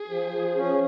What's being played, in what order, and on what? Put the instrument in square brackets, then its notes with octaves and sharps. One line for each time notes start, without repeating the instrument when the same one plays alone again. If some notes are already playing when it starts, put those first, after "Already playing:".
Already playing: [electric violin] G#4
[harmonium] F3
F3
C#4